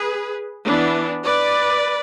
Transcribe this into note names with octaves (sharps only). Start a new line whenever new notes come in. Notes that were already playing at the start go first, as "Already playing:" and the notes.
Already playing: G#4 B4
E3 B3 D4
B4 D5